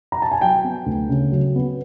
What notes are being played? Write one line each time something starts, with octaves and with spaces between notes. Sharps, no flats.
A#5
A5
G#5
F#3 G5
B3
D2
C#3
F#3
B3